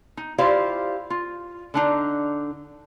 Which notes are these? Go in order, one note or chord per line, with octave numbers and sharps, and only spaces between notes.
D#4
E4 F4 G4 C5 D5 F5
F4
D3 D4 D#4